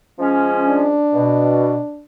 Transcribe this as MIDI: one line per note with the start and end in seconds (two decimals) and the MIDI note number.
0.19 0.94 53
0.19 0.94 56
0.19 0.94 61
0.68 2.04 62
1.14 1.78 47